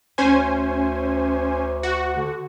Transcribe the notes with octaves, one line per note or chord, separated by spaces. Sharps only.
D2 C#4 C5 G#5
F#4
D3